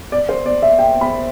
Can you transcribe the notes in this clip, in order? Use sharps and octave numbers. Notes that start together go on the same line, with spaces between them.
D5
C5
D5
E5
G5
B5